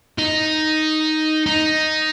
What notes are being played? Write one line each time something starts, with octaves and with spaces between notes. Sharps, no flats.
D#4
D#4